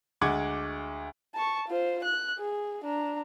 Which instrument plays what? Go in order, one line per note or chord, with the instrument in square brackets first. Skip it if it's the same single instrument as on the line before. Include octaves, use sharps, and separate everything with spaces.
[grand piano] D2 G#3 F#5 D6 G#6
[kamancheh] A5 C#6
F4 C5
F#6
G#4
D4 A#5